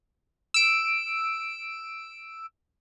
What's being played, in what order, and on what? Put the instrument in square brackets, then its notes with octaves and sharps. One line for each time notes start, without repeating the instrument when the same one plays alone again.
[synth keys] E6 D7